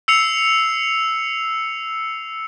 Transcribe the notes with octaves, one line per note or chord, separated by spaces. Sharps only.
E6 C7 C#7 F7